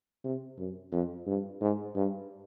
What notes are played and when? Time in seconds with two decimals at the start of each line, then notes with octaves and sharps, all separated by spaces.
0.24 C3
0.58 F#2
0.92 F2
1.27 G2
1.61 G#2
1.96 G2